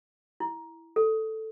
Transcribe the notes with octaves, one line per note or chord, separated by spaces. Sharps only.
E4
A4